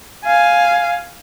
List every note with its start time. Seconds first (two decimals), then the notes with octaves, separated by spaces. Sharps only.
0.24 F5 G#5